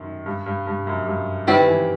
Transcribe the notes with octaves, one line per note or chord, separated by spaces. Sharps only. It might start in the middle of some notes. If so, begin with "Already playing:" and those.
Already playing: F#2 D#3
G2
G2
G2
F#2
G2
D#3 G3 C4 E4 G4 B4
E3